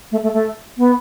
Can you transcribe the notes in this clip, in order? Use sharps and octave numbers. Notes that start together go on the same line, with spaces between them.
A3
A3
A3
B3